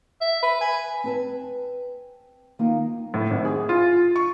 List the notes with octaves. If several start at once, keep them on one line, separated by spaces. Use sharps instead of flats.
E5
B4
G#5
C4 B4 A5
D#3 A#3 D#4 F4 A#4
A2
G#1
G#4
F4
C#6